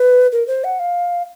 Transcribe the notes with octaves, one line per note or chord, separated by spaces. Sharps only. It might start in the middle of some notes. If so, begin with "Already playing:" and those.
Already playing: B4
A#4
C5
F#5
F5